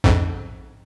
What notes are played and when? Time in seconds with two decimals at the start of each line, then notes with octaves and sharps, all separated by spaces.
0.04 A#1 F2 G#2